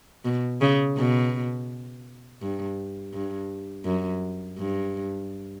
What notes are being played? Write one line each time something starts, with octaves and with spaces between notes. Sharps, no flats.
B2
C#3
B2
G2
G2
F#2
G2